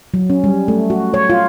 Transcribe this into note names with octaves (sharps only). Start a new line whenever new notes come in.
F#3
C#4
G3
A3
F#4
C#5
F4